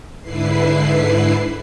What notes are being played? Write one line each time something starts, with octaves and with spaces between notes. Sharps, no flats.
G#2 D3 E4 B4 C7